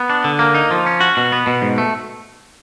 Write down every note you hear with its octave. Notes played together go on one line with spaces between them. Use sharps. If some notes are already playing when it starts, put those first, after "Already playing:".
Already playing: B3
D4
D3
A#3
D#4
F3
C#4
F#4
B2
B3
B2
G#2
A3